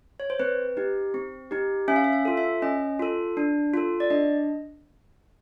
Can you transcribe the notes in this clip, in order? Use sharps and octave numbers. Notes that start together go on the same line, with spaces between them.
C#5
C5
C4 B4
D#4 G4
C4
D#4 G4
C#4 E5
F5
E5
F5
F4 A4
E5
C#4 D#5
F4 A4
D4
F4 A4
D5
D4 D#5